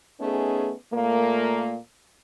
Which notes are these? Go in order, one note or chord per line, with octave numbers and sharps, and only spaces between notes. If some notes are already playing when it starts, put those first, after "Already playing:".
A3 B3 C#4 D#4 G#4
A#2 A3 A#3